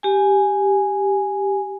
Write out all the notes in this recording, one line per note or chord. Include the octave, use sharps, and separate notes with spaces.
G4 G#5